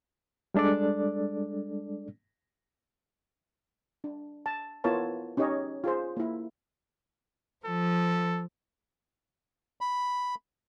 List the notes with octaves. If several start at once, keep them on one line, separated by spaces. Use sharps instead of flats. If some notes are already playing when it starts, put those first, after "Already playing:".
G3 G#3 D4 A4 D5
D4
A5
B3 E4 F4 A#4 C#5 A5
C#4 D#4 G4 C#5 D#5
F4 G#4 C5
A#3 E4
F3 A4
B5